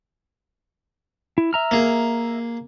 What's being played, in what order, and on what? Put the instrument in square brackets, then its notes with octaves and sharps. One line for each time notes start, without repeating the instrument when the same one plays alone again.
[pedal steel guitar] E4
E5 A#5 F6
[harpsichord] A#3 G#4